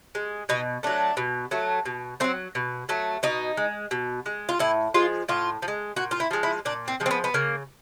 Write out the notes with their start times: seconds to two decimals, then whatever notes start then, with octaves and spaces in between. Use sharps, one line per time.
0.15 G#3
0.49 B2 D#4
0.83 F#3 A3 D4
1.17 B2
1.51 F#3 A3
1.86 B2
2.20 F#3 A3 C4
2.55 B2
2.89 F#3 A3
3.23 B2 D#4
3.57 G#3
3.91 B2
4.26 G#3
4.49 F4
4.59 A2 E4
4.94 F3 G#3 F4
5.29 A2 F4
5.62 F3
5.68 G#3
5.96 A#2 F#4
6.11 F4
6.20 E4
6.31 F3 G#3
6.43 E4
6.65 A#2 D4
6.88 C4
7.00 F3 G#3
7.06 C4
7.11 B3
7.24 B3
7.34 C#3 A#3